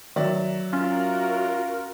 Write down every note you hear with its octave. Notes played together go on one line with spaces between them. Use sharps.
D#3 F#3 D5 E5
C#4 F4 F#4 A#4